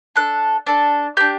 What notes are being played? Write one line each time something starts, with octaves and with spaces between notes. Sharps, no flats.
D4 A4 F#6
D4 A4
D4 G4 G6